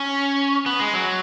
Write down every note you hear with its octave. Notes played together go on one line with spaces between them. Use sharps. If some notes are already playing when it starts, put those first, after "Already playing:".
Already playing: C#4
B3
G#3
F#3